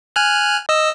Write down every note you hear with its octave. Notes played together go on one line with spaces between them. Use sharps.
G#5 F6 F#6
D#5 E6